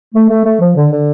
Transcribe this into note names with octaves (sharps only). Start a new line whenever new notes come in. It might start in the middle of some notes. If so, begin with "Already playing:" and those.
A3
A3
A3
F3
D3
D3